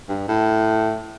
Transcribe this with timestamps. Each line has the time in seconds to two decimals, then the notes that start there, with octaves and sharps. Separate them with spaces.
0.09 G2
0.28 A2